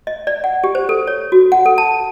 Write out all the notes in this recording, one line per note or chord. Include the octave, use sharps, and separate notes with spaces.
D#5
D5
F#5
G4
C5
A4
C#5
F#4
F#5
A4
A5